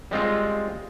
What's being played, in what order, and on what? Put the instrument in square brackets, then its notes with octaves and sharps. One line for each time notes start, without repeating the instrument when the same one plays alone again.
[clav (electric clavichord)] G3 G#3 C4 F4